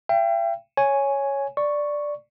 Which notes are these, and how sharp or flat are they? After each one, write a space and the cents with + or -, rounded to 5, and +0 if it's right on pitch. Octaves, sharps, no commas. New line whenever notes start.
E5 +45 G5 +5
C#5 +0 G#5 +0
D5 +0 C#6 +0